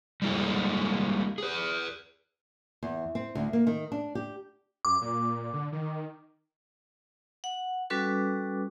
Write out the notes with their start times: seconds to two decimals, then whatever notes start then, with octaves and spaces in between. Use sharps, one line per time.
0.22 G3 G#3 A#3 E4 A4
1.38 G#4 B4
2.83 E2
3.15 C4
3.35 D2
3.53 A#3
3.67 D#3
3.92 D4
4.15 G4
4.85 F#2 D6
5.02 A#2
5.53 D3
5.72 D#3
7.44 F#5
7.90 G3 C#4 F#4 A4 B4 D6